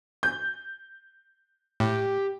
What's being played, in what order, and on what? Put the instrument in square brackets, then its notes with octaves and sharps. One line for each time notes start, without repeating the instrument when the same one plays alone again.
[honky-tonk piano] G6
[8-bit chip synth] A2 [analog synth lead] G4